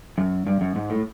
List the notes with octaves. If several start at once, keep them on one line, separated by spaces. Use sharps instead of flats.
F#2
G2
F#2
G#2
A2